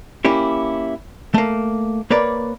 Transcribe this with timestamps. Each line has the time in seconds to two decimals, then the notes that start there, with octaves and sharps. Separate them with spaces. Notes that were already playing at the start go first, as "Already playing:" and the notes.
0.25 A#3 C#4 E4 G4
1.34 A3 A#3
2.10 A#3 A#4 B4 C#5 D5